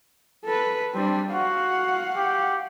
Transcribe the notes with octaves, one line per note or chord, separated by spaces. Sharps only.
A4 B4
G3 C4 D4
F#4 F5 F#5
G4